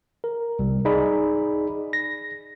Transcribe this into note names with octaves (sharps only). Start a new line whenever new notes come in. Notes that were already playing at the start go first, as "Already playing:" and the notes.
A#4
C2 G3
D#4 G#4 D5 B5
A#6